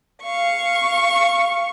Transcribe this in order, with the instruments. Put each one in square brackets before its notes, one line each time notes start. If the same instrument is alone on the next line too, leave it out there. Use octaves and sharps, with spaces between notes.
[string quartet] F5 C#6